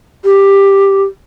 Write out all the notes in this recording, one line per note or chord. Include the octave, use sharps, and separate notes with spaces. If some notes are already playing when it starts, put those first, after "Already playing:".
G4